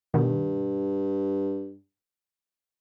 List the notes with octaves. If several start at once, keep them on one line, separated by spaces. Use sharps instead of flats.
G2 B2 D#3